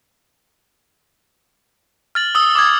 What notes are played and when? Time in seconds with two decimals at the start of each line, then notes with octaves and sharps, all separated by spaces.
2.15 F6 A6 F#7
2.35 D#6 E6 G7
2.55 D6 D#6 G#6